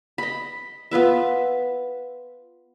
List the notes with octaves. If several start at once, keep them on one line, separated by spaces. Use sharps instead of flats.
D#5 B5
B3 F4 B4 E5